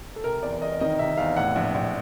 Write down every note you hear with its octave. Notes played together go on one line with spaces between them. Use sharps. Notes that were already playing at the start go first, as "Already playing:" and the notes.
A4
C3 A#4
E2 D5
E2 D#5
D#3 D#5
C3 E5
E2 F5
A2 F#5
A#1
A#1